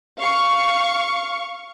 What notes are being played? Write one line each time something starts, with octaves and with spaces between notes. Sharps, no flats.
F5 C#6